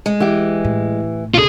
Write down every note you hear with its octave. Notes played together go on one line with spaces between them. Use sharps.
G#3
E3 G4
A2
C#2 B2 D3 F4 G#4